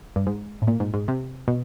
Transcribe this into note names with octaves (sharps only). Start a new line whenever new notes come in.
G2
G#2
A2
A#2
G#2
G#2
C3
B2